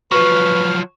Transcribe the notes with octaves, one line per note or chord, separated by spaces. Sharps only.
F3 F#3 B4 C#6 F6